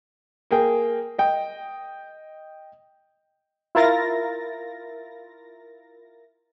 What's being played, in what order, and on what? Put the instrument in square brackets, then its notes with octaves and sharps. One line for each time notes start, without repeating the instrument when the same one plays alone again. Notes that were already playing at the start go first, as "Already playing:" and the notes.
[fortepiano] A#3 G#4 G5
D#5 G5
[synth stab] E4 F4 A#4 A6 A#6